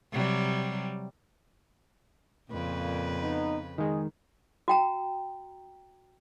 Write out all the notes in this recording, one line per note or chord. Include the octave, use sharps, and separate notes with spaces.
C3 F#3 G3
F2 A#2 C#3 B4
B3 D#4
D#3 G#3 G#4
F#4 G5 A#5